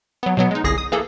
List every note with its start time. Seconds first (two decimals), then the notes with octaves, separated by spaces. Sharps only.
0.23 F#3 B3
0.37 B2 F#3 B3
0.51 G#3 D#4
0.64 G1 C2 G#4 A#6 C7
0.78 D#6
0.92 E3 A#3 G#4 A4